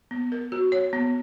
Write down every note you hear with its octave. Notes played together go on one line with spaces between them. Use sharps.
B3
A#4
F#4
C#5
B3